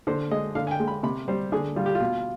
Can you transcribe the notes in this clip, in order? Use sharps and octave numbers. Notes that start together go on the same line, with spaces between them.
D3 C5
G#3 D#5
D3 F5
G#5
G5
G#3
B5
C3 B5
G3 C5
D3 G#4
G3 F4
G4
F4
B2